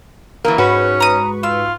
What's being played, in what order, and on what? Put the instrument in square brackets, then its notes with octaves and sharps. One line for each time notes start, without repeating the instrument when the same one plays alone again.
[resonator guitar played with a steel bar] E3 F#3 A#3 [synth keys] A#4
[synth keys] G#2 B4 C#6 [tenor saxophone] C#4 [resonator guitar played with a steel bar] F#4
[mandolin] A#5 D#6
[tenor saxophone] F4 [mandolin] E6